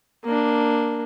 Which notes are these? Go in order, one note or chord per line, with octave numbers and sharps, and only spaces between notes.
A#3 D4